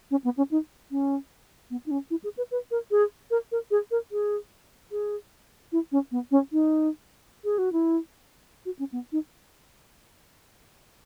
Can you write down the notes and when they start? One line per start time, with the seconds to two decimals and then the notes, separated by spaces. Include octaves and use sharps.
0.11 C#4
0.24 B3
0.37 C#4
0.51 D#4
0.91 C#4
1.70 B3
1.86 D#4
1.91 C#4
2.10 E4
2.24 G#4
2.37 B4
2.51 B4
2.71 A#4
2.91 G#4
3.31 A#4
3.52 A#4
3.71 G#4
3.91 A#4
4.12 G#4
4.91 G#4
5.72 E4
5.92 C#4
6.11 B3
6.31 C#4
6.52 D#4
7.44 G#4
7.58 F#4
7.73 E4
8.65 F#4
8.79 C#4
8.92 B3
9.12 D#4